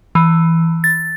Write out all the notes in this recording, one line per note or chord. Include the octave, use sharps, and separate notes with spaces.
E3
A6